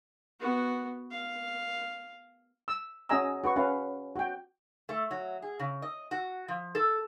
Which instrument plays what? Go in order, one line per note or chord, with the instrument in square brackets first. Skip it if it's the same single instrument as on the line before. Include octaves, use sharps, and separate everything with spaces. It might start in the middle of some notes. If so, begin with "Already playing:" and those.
[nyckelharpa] B3 F#4
F5
[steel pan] E6
C#4 F#4 D#5 G#5 A#5 E6
F#4 B4 C#6
C#4 B4 F5
F#4 G5
[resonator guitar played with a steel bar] A3
F#3
G#4
C#3
D#5
F#4
F3
A4